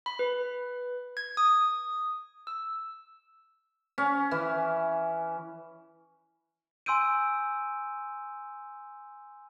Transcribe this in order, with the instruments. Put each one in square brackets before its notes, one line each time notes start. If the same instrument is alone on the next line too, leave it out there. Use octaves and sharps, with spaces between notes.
[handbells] B5
B4
G#6
D#6
E6
[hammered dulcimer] C#4
E3
[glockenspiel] G#5 C6 E6 G6 D7 D#7